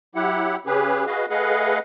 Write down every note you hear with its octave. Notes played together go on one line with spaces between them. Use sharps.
F#3 E4 G4 F#5
C#3 C#4 G4 G#4 B4
F#4 G#4 B4 D#5 F5
A3 G#4 B4 D#5 F5 F#5